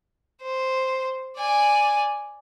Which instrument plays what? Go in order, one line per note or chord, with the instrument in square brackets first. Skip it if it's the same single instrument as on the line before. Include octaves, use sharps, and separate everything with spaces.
[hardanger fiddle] C5
D5 G#5